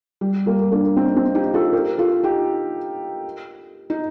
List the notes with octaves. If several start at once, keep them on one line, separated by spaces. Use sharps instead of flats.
G3
G3 A#3
A#3 D4
C4 D#4
C4 D#4
D#4 G4
F4 A4
G4 A#4
F4 A4
D#4 G4
D#4